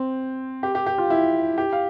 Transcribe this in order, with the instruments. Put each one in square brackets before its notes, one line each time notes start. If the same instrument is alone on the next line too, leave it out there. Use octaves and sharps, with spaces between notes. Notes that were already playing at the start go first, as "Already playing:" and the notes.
Already playing: [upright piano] C4
G4
G4
G4
F4
E4
G4
F5